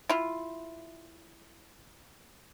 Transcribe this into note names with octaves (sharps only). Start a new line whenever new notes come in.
E4 F4